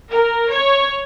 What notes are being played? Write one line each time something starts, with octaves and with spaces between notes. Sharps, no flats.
A#4
C#5